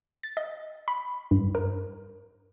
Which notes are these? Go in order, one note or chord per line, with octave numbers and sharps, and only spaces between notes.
A6
D#5
B5
G2
A#4